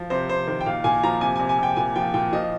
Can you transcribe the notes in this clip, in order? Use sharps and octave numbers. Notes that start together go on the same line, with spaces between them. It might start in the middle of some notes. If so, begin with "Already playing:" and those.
Already playing: F3
C3 C5
C3 C5
D#3 C5
G5
A#2 F5
A#2 G#5
F3 A#5
C3 G#5
C3 G#5
G#5
C3 G5
A#2 G#5
F3 G5
A#2 G5
F3 D#5